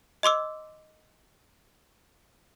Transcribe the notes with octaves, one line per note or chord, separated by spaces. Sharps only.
D#5 C6 D6 E6